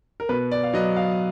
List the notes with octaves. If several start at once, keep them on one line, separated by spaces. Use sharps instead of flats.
A#4
B2 B4
D5
F5
F#3 B3 D#5
F5